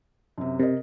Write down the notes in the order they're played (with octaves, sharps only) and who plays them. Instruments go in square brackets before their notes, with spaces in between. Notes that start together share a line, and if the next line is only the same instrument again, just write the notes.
[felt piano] F#2 C3
[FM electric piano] C3 [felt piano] A#4 D#5